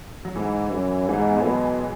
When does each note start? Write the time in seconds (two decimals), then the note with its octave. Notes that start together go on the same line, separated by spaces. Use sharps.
0.25 F#3
0.36 G#2 E3
0.72 F#2
1.09 G#2 E3
1.18 G#3
1.28 B3
1.37 G#3
1.45 B2 F#3